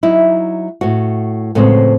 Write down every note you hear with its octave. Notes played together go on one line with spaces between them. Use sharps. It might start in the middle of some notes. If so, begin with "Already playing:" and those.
F#3 D#4 E4
A2 F#4
A2 C#3 F3 G#3 B3 C4